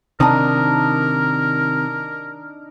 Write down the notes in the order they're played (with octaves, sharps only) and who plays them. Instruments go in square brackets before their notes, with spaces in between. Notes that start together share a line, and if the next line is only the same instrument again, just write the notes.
[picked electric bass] C3 D#3 [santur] D4 D#4 D#6 [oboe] A#4